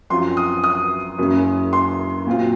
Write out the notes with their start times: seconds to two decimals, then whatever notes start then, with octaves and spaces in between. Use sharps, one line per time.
0.10 F#2 F3 C4 F4 C6
0.37 D#6
0.64 D#6
1.18 F#1 F#2 C#3
1.73 C6
2.27 A#2 F#3 C4 F4